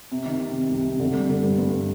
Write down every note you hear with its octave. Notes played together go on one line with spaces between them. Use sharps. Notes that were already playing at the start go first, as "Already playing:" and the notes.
C3
D#3
C3
C3
C2
C3
D3
G3
D3
G2
G2